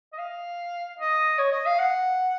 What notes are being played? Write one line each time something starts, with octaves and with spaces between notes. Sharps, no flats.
D#5
F5
D#5
C#5
D#5
F5
F#5